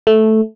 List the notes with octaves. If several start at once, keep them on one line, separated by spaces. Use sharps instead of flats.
A3